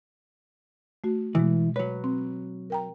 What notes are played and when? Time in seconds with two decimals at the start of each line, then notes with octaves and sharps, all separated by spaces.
1.04 A3 F#4
1.35 B2 E3 G#3
1.76 F#3 B4 C#5
2.04 C4
2.70 A#4 G5 A#5